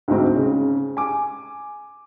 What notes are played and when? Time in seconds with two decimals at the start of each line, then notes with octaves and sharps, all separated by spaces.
0.08 D2 G#2 C4
0.36 C#3
0.97 G#5 D6